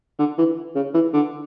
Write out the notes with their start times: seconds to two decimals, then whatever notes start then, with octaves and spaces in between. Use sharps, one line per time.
0.19 D3
0.38 E3
0.76 C#3
0.94 E3
1.13 D3